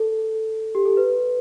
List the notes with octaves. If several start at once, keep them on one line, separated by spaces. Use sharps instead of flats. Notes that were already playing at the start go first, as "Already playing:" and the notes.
Already playing: A4
G4
A4
B4